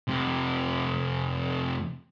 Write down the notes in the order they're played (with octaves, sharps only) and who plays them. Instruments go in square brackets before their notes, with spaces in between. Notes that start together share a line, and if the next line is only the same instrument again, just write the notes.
[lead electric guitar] F2 C3